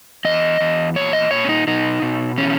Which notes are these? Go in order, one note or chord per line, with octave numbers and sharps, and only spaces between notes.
E2 D#5
E2
A#2 C#5
D#5
A#2 C#5
C#4
D#4
B2 D#4
B2
E3 C#4